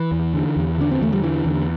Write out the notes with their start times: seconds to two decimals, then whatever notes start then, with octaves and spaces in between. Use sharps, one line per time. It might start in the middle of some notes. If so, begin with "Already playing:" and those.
Already playing: E3
0.12 E2
0.34 D3
0.57 E2
0.78 D3 D4
0.91 C4
1.01 E2 A3
1.12 G3
1.23 D3 E3
1.45 E2 D3